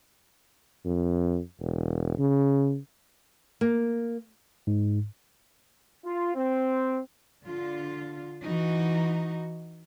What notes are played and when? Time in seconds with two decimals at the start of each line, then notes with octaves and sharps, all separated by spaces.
0.85 F2
1.60 E1
2.19 C#3
3.61 A#3
4.67 G#2
6.05 F4
6.35 C4
7.44 D3 F4
8.43 E3 D#4 F#4